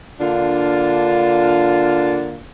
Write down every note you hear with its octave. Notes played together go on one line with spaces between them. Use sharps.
D3 A#3 D4 F4